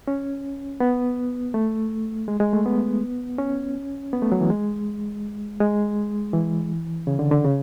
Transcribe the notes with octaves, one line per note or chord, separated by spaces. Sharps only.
C#4
B3
A3
G#3
G#3
A3
B3
C#4
B3
A3
F#3
E3
G#3
G#3
E3
C#3
D3
D3
C#3